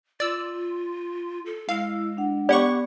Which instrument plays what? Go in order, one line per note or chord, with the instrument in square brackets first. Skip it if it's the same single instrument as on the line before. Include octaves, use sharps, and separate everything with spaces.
[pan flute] F4 [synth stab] D5 E6
[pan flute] A4
[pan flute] G#3 [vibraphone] E4 E6 [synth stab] F5
[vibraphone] D4 F#5
[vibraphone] B3 [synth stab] G4 F#5 C#6 [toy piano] D5